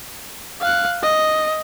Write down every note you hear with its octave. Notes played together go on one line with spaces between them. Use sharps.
F5 F#6
D#5